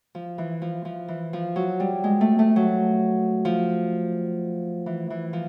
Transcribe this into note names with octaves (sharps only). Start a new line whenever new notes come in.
F3
E3
F3
F3
E3
F3
F#3
G3
G#3
A3
A3
F#3
F3
E3
E3
F3